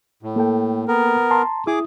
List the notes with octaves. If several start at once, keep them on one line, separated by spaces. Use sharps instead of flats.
A2
A#3 A4 G5
B3 A#4
A5 A#5 C6
E4 G#4 D6 D#6